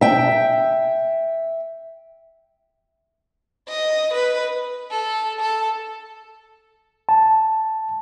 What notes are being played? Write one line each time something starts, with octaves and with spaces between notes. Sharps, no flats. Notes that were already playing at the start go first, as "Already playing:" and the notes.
E5 G5
D#5
B4
A4
A4
A5